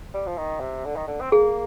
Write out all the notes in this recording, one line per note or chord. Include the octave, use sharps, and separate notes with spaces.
G3
F3
D#3
C3
D3
D#3
D3
C4
A#3 G#4